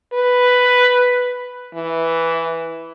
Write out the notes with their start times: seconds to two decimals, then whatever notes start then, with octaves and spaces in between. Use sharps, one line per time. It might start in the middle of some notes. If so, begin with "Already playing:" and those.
0.13 B4
1.75 E3